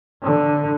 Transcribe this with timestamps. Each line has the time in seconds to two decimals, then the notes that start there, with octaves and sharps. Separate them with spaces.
0.23 D3